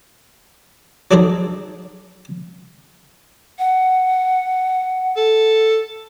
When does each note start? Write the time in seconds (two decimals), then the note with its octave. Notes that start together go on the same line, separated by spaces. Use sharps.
1.11 F#3 D4 D#4 G#4 A4 C5
3.59 F#5
5.17 A4